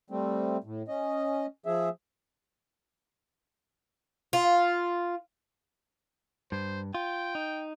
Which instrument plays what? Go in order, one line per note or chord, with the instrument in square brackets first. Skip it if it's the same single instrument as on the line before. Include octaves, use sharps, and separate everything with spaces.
[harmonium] G3 A3 C4
A2
C#4 D#5
F3 G#4 E5
[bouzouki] F4
[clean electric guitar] G2 [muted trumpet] C5
[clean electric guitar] F4 [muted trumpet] G5
[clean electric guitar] D#4